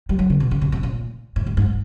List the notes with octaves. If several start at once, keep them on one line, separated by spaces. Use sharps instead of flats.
G3
F#3
C#3
B2
C#3
C3
C3
A#2
A2
A2
G#2